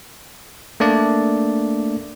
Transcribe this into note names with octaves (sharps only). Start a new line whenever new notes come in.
A3 A#3 D4 D5